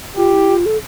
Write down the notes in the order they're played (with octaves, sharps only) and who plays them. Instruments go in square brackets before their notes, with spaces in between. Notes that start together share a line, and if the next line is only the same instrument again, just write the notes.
[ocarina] F4 [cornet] G4
[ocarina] E4
F4
A4